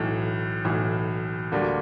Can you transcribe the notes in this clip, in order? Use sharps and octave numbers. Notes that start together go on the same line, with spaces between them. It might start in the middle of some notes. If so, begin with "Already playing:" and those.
Already playing: B1 A2 E3
B1 A2 E3
D2 D3 G3 A#3 D4